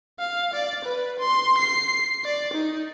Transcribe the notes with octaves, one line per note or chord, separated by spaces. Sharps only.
F5
D5
B4
C6
C7
D5
D#4